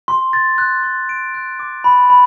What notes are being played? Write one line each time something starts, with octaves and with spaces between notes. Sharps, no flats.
C6
A6
F#6
C6
D7
F#6
D6
B5
B5